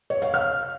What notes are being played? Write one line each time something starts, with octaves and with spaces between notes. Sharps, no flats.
C#5
F5
F6